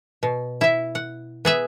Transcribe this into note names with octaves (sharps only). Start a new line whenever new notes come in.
B2
E4 E5
F#5
B3 G#4 E5